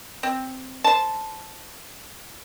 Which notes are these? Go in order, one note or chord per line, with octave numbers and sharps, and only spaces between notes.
C4
C5 A5